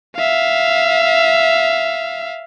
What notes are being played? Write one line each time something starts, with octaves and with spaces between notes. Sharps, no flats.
E5 F5